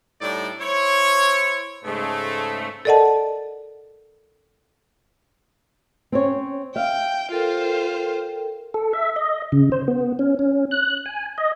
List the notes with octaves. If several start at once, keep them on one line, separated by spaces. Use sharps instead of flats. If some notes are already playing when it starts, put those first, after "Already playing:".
A2 G3 D4 D#4 D5
E4 C5 C#5
G#2 C#3 G#3 A3
A4 A#4 D5 D#5 F#5 A5
C4 C#4 C#5
E5 F5 G5
F4 A4 A#4 C5 G5
A4
E5
D#5
C#3
C5
B3
C#4
C#4
F#6
G#5
D#5